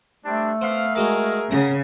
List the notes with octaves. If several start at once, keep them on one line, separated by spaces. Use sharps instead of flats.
G3 A3 C4 D4
B3 C4 F5
G#3 F#4 G#4 A#4 F5
C#3 A#4 F#5 A#5